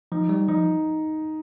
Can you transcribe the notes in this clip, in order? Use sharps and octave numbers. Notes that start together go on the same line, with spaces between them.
F3 D#4
G3
F3 D#4